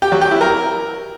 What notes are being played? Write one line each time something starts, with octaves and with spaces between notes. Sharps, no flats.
G4
F#3
G4
E4
A#4